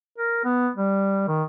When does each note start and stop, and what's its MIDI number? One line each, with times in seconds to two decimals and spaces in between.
0.18 0.44 70
0.44 0.69 59
0.76 1.24 55
1.28 1.43 51